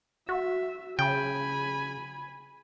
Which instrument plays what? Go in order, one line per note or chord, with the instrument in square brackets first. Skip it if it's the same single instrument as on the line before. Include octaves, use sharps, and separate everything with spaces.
[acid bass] F#4 [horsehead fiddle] E5
[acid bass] C#3 [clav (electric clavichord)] G5 [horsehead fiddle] G#5 B5